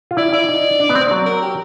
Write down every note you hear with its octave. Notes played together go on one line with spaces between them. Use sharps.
F4
E4 D5
E4 D5
D#4
D4
B3
C4
F#3
A#4
G4